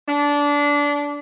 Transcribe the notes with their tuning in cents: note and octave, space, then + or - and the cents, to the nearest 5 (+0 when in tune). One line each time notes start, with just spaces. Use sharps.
D4 -20